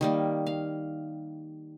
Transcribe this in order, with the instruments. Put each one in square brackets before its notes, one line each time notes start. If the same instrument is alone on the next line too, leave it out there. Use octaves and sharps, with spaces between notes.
[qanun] D#3 G3 A#3
F5